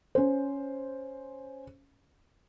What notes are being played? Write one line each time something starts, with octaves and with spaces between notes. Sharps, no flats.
C#4 C5